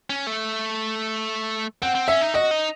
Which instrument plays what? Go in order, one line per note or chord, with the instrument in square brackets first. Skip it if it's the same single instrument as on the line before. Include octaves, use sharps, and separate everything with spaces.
[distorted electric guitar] C#4
A3
[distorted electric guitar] C4 [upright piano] F#5
[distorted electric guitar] C4
[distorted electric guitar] C#4 [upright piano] E5
[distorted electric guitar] D#4
[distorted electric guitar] F#4 [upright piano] D#5
[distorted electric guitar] D#4